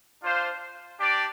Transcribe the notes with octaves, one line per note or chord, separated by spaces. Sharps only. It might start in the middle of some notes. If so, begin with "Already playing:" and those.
D4 F4 C5 F5
D4 G4 D5